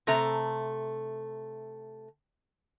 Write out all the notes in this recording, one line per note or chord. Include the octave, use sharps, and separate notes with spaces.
C3 A3 A#5